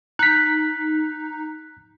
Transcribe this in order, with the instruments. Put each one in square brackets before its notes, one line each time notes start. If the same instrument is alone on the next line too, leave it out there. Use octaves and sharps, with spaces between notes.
[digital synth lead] D#4 [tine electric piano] F#6 B6